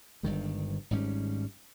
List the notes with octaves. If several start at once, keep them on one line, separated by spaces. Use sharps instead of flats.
G1 G2 D#3 G#3
G#1 G#2 G3 C#4